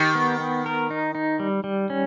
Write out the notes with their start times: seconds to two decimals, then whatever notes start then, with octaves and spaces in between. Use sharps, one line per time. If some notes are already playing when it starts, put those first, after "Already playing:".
Already playing: D#3 G4
0.15 B3
0.40 B3
0.66 A#4
0.91 D#4
1.15 D#4
1.40 G3
1.64 G3
1.90 C#4